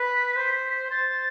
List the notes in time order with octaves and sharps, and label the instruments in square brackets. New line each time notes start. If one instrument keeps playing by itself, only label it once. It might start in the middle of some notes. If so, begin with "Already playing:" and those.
Already playing: [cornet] B4 [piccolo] B6
[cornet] C5
[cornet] C5 [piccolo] A6